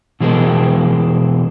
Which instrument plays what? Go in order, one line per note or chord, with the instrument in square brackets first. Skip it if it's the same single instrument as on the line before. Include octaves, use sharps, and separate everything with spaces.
[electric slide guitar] B2 E3 G#3 C4 A4 A#4